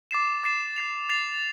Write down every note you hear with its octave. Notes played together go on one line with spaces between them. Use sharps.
D6 A6 C7 E7
D6 A6 C7 E7
A6 C7 F7
A6 C7 F7